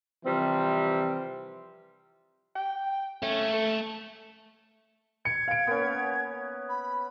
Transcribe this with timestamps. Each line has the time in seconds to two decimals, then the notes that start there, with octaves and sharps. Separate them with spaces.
0.25 C3 E3 F3 G3 C4
2.56 G5
3.22 A3 C#4
3.53 A4
5.25 G#6 C#7
5.48 F5 D7
5.67 A#3 B3 C#4
6.69 B5